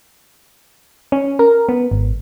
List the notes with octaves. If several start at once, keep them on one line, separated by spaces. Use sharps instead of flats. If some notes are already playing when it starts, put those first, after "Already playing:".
C#4
A#4
B3
G#1